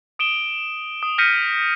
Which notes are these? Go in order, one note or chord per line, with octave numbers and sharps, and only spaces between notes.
D#6 D7 E7 G7
D#6
F6 G6 A#6 B6 C#7 D#7